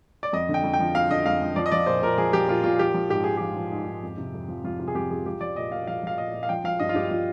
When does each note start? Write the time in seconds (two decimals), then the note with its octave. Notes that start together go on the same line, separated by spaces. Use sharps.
0.23 D5
0.33 F2 D#5
0.49 D3
0.54 G5
0.63 F2
0.74 G5
0.80 F3
0.95 F2 F5
1.11 D3 D#5
1.26 F2 F5
1.41 F3
1.56 F3 D5
1.66 D#5
1.72 F3 D5
1.86 A#2 C5
2.02 A#2 A#4
2.18 F3 G#4
2.33 F3 G4
2.48 A#2 F4
2.64 A#2 F4
2.79 F3 G4
2.94 F3
3.10 G#2 G4
3.24 G#2 G#4
3.37 F3 G4
3.56 F3
3.72 G#2
3.87 G#2
4.03 F2
4.18 C3
4.34 F2
4.48 F3
4.64 F2 F4
4.79 C3 F4
4.88 G#4
4.95 F2 G4
5.10 F3 G#4
5.26 F3 G4
5.41 F3 D5
5.56 A#2 D#5
5.72 A#2 F5
5.87 F3 F5
6.03 F3 F5
6.18 A#2 D#5
6.33 A#2
6.43 F5
6.49 F3 G5
6.64 F3 F5
6.80 G2 D#5
6.89 F4
6.95 G2 G4
7.11 F3 F4